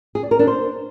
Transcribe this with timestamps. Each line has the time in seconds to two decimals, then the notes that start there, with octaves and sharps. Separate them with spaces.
0.15 G#4
0.23 D5
0.31 A#4
0.39 D4
0.47 C5